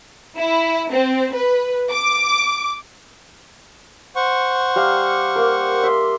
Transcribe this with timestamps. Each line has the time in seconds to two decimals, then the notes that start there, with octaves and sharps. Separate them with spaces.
0.37 E4
0.90 C4
1.34 B4
1.92 D6
4.16 C5 F#5 C#6
4.76 G3 F5 A#5
5.36 A#3 A#4
5.83 E5 C6 D#6